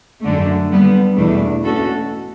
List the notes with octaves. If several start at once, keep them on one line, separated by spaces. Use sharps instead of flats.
F#2 D3 A3
D3 G3 B3
E2 B2 A3 D4
B2 A3 C#4 F#4 A4